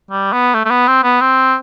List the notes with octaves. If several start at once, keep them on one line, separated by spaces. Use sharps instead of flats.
G3
B3
A3
A3
B3
C4
B3
C4